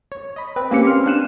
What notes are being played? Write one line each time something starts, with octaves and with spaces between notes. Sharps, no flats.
C#5
D#5 B5
C4 B4
A#3 C4 C#4 G4 C#7
C6 F6
D4 F5 F#6 D#7 E7